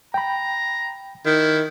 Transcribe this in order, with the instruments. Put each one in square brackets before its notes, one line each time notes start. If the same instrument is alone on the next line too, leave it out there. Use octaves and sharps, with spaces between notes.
[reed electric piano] G5 B5 [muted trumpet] A#5
[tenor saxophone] D#3 [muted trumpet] E4